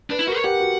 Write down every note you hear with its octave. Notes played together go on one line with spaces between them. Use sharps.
D4 B4
E4
F#4 A#4
C#5
G4 F#5
F#4